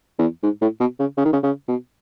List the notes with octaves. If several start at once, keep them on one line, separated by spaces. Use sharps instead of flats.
E2
G#2
A2
B2
C#3
C#3
D#3
C#3
C#3
B2